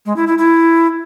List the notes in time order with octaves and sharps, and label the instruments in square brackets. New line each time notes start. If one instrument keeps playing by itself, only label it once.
[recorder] G#3
E4
E4
E4